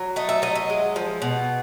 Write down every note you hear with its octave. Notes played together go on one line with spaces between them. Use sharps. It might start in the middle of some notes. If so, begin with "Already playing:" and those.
Already playing: F#3
A3 D#5
E5
F#3 D#5
D#5
G#3
F3
B2